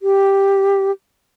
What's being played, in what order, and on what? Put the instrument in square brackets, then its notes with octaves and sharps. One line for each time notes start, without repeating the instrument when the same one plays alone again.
[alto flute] G4